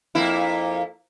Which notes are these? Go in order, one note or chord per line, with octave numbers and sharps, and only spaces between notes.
F2 A#3 E4